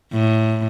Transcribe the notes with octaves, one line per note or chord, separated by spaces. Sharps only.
A2